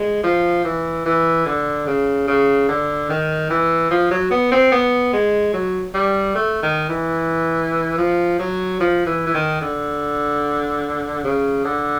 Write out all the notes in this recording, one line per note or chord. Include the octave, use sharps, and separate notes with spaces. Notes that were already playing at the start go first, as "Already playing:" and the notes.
Already playing: G#3
F3
E3
E3
D3
C#3
C#3
D3
D#3
E3
F3
F#3
B3
C4
B3
G#3
F#3
G3
A3
D#3
E3
F3
F#3
F3
E3
E3
D#3
D3
C#3
D3